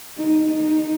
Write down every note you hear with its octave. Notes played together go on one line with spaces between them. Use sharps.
D#4
D#4